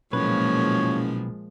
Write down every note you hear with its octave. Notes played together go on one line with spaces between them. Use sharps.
F#1 B1 A#2 F3 G#3 B4 C#5